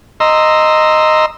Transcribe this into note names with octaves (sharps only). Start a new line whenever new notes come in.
D#5 A#5 C6 E6